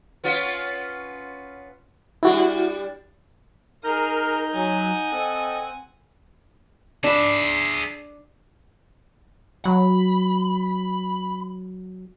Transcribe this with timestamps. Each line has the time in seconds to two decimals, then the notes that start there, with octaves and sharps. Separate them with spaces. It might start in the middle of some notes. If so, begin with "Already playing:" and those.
0.24 B3 C#4 F4
2.23 G3 D4 E4 F#4
3.84 D#4 G#4 A#4 A#5 F6 G6
4.53 F#3 F#5 G#5
5.12 C4 A4 D#5
7.04 D4 G#4 E5 B5
9.65 F#3 B5